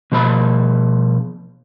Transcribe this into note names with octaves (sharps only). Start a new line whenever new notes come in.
B2 F3 B5